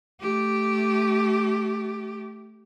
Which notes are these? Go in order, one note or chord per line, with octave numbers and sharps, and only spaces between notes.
A3 G4